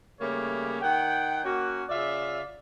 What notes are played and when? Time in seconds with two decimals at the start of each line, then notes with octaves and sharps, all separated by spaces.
0.20 C#3 G3 A3 A#3 C#5
0.81 D#3 F#5 G5
1.44 A#3 C#4 F#4
1.90 C#3 F4 D5 E5